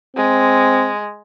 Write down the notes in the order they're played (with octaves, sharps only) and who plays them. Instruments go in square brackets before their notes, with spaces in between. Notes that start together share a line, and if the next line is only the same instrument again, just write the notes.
[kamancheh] G#3 [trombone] C4